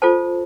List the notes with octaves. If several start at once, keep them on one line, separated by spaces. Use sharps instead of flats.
F4 A4 C5 A5